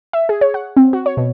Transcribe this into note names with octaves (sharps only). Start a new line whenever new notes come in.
E5
G#4
C#5
F#5
C4
F#4
C#5
B2